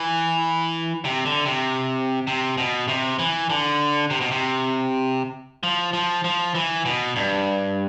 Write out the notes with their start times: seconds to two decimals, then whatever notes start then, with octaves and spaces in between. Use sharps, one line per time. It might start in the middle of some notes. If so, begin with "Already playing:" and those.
Already playing: E3
1.05 C3
1.25 D3
1.46 C3
2.27 C3
2.58 B2
2.88 C3
3.19 E3
3.50 D3
4.10 C3
4.21 B2
4.31 C3
5.63 F3
5.93 F3
6.24 F3
6.55 E3
6.85 B2
7.16 G2